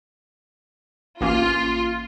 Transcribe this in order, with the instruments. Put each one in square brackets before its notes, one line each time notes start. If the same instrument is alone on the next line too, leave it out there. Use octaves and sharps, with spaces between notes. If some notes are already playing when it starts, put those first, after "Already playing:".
[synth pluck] A1 A#3 C#4 [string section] F4